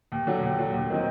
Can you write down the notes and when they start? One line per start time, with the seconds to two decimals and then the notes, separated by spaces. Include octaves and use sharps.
0.12 D#2
0.27 D3 F#3
0.43 D#2
0.59 D3 F#3
0.74 D#2
0.90 D#3 F#3 C4 D#4